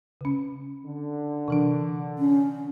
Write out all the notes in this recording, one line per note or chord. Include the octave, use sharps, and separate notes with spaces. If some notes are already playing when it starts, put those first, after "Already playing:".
C#3 C#4
D3
C3 E3 D4
C#4